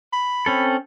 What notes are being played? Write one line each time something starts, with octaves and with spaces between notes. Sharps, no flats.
B5
C4 C#4 A4